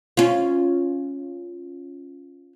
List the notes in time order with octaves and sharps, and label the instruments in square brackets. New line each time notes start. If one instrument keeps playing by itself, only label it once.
[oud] C#4 F4